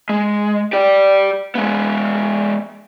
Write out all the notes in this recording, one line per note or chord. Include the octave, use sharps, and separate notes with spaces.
G#3
G4 D5
G#3 B3